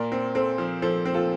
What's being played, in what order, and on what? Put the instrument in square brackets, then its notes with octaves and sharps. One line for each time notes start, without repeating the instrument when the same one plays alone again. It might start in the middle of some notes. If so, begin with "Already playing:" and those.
Already playing: [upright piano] A#2 [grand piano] A#4 D5
[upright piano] C4
[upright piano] C4 [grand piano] A4 C5
[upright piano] F3
[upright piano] F3 [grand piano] A4 C5
[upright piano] C4
[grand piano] F4 A4